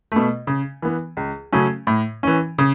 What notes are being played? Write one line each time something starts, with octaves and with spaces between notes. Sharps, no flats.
B2 A3
C#3
E3 B3
C#2
C#3 F#3 A3 C#4
A2
E3 C#4
C#3